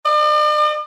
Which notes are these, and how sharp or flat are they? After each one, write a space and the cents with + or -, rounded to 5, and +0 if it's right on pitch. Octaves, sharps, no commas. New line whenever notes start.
D5 +45